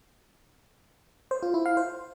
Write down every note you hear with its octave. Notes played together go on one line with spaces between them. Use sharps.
C5
F4
E4
F5
C5